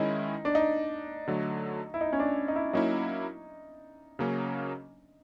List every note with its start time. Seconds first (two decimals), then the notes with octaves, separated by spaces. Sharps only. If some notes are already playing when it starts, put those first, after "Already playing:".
Already playing: D#3 G#3 C#4 D#4 E4
0.45 D4
0.55 D#4
1.28 D3 F#3 A3
1.94 E4
2.01 D#4
2.13 C#4
2.19 D4
2.48 D#4
2.55 E4
2.73 F#3 A#3 C#4 D#4 E4
4.19 C#3 F#3 A#3 C#4